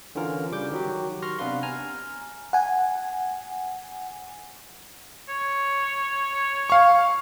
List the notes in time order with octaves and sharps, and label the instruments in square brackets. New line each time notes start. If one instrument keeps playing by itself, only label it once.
[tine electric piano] D3 E3 C#4 F4 A#4
C#3 G3 D6 G6
D#3 F#3 F#4 G4
C6 C#6 F6 A#6
C3 B3 D4 B4 F5 C6
G#5 A#5 F6
[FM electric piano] F#5 G#5
[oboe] C#5
[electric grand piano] F5 C#6